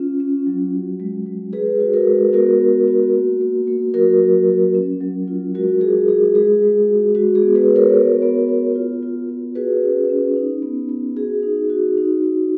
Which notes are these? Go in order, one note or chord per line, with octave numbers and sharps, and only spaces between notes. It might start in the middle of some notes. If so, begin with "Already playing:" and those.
Already playing: C#4 F4
C#4
F#3
F#4
G#3
G#3
G#3 G#4 B4
F#4
F#4 A#4
G#3
B3 F#4 A#4
B3
F#4
A#3
A#3
A#3
F#3 F#4 A#4
F#3
F#3
C#4
F#3
F4
G#3 F#4 A#4
F4 G#4
G#3 G#4
G#3 G#4
G#3
F#4
G#3 F#4
G#4
B3
G#4 B4
F#4
A#4 C#5
B3
B3
B3
F4
F4
F4
F#4 G#4 B4
C#4
C#4
D#4
B3
B3
F#4 G#4
D#4
F#4
D#4
F#4